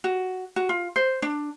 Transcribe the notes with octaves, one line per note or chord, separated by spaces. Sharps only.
F#4
F#4
F4
C5
D4